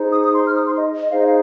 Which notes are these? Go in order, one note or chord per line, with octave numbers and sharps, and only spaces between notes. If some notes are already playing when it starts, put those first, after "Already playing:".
Already playing: D#4 G#4 C5
D#6
D#6
C6
F6
D#6
C6
D#5
D#5
D#4 G#4 C5 F5
D#5
F5